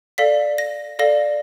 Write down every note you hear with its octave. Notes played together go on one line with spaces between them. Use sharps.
A4 D5 F5 B6
A#6
A4 D5 F5 A#6